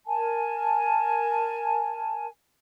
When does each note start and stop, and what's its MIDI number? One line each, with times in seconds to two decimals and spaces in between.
0.06 2.27 70
0.06 2.27 80
0.06 2.27 81